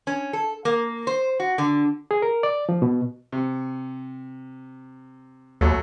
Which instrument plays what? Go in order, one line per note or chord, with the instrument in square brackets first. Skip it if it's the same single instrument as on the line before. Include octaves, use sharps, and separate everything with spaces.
[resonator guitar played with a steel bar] C#4
A4
A#3
C5
F#4
D3
[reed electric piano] G#4
A#4
D5
F3
B2
[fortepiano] C3
[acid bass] D#2 [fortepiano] F#3 A3